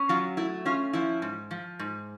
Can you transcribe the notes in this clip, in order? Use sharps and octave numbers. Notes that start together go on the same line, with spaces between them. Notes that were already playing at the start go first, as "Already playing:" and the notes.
Already playing: C#4
F#3 F4
A3 E4
C#4 F4
F3 E4
G#2
F3
G#2